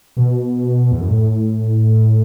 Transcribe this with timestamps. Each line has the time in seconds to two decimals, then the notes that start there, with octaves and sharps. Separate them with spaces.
0.17 B2
0.91 E2
1.00 F#2
1.08 A2